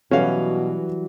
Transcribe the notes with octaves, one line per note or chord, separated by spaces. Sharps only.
B2 E3 F#3 G3 C#4 F#4 F5